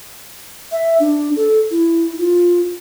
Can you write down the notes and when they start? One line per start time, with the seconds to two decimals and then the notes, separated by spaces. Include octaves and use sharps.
0.72 E5
1.00 D4
1.36 A4
1.71 E4
2.19 F4